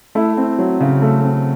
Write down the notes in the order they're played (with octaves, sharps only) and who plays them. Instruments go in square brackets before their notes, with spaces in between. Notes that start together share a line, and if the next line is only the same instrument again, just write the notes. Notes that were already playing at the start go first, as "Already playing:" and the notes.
[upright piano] A3 E4
C4
F#3
C#3
A3
C4